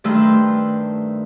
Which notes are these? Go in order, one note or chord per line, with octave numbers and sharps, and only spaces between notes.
G2 D#3 A3 B4 C5 E6